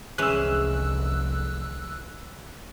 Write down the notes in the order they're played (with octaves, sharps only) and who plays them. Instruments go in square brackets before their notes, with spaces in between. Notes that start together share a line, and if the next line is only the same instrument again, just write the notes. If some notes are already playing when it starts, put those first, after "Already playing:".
[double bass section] F1 C2 D3 [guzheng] E3 G#3 C#4 [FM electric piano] E6 F#6